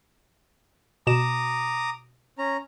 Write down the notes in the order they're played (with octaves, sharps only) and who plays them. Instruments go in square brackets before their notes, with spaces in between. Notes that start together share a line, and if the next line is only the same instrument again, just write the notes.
[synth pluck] B2 E7 [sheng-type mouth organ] A#5 D6 D#6
[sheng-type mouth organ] C#4 A#5